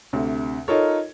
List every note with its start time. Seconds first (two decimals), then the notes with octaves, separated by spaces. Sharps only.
0.13 D2 C3
0.68 D#4 F4 A4 A#4 C#5